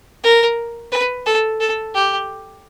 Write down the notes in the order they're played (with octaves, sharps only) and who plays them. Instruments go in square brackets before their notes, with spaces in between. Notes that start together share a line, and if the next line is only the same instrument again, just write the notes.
[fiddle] A#4
B4
A4
A4
G4